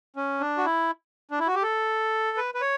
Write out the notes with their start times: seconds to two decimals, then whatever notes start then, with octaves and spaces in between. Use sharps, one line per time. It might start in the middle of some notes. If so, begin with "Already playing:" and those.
0.16 C#4
0.40 D4
0.58 F#4
0.65 E4
1.31 D4
1.40 E4
1.47 F#4
1.55 G4
1.63 A4
2.37 B4
2.54 B4
2.61 C#5